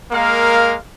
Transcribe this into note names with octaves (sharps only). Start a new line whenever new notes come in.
G#3 A#3 A#4 F5